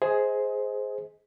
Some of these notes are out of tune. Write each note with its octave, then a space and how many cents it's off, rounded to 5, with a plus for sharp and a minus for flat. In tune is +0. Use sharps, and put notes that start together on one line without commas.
G#4 +5 C5 +0 D#5 +25